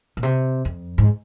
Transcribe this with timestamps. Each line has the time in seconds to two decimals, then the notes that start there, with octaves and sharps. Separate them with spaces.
0.17 A#2
0.23 C3
0.65 F2
0.98 G#2